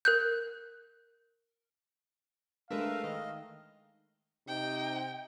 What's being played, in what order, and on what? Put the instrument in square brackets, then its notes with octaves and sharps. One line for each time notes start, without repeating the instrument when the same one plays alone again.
[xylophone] A#4 F#6 G6
[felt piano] G#3 A3 [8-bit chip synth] D4 B4 [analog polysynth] A#4 E5 [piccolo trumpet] F5
[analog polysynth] D#3 [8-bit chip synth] D#5
[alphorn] C3 [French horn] D#4 [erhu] G5